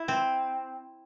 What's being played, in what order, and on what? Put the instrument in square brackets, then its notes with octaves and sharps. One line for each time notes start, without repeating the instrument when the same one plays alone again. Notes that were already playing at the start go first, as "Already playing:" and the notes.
Already playing: [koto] E4
C4